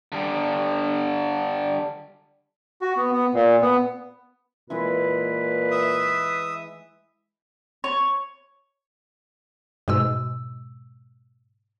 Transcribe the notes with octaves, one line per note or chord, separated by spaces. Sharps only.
D3 G3
F#4
B3
B3
A#2
B3
A#2 E3 G#3 E4 B4
E5 D#6
C#5
G#2 B2 G#3 E6